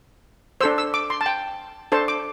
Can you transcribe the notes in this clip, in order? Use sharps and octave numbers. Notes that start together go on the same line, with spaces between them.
D4 A4 C5 E6
E6
D6
C6
A5
G5
D4 A4 C5 A5
D6